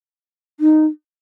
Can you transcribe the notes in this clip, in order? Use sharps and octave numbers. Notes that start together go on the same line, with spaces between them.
D#4